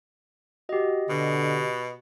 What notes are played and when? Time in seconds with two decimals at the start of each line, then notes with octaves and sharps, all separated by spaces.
0.69 F#4 G4 D#5
1.10 B2 D3